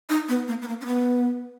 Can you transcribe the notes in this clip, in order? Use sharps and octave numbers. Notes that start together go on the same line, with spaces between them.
D#4
B3
A#3
B3
A#3
C#4
B3